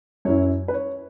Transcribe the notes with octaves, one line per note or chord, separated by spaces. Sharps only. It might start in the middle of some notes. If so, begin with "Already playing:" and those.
F#2 F#3 C#4 E4 C#5
B4
C#5